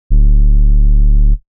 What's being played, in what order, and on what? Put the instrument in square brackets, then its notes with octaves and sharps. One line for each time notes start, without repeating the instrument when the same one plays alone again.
[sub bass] D1